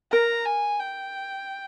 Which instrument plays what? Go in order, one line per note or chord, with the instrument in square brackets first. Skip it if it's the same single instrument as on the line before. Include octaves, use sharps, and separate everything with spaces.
[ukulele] A#4 [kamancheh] A#5
[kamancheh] G#5
G5